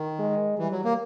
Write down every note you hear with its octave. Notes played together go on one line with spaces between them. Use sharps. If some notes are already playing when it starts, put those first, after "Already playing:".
Already playing: D#3
G#3
E3 G3
F#3
A#3